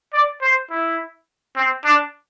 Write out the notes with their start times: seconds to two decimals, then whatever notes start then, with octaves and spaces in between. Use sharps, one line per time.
0.13 D5
0.42 C5
0.70 E4
1.56 C4
1.85 D4